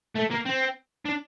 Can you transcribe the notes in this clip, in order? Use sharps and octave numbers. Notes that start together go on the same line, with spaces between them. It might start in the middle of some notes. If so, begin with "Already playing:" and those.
A3
A#3
C4
D4